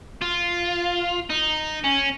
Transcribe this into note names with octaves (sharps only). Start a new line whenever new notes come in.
F4
D#4
C#4